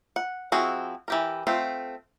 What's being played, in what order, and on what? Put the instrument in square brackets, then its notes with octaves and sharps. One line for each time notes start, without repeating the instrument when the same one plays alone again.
[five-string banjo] F#5
F3 C4 E4 F#4 G#4
E3 G4 A#4
A3 C4 F4